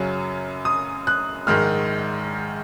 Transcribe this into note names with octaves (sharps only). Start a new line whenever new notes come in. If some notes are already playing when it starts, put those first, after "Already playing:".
Already playing: F#2 C#3 F#3 C#4
D#6
F#6
A#1 G#2 D#3 G#3 F6